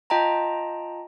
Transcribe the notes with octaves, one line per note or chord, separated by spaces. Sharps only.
F4 D#5 G5 A5 A#5